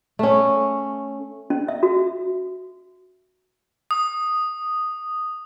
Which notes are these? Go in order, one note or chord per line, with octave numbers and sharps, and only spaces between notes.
A3 C#4
C#4
E5
F#4
D#6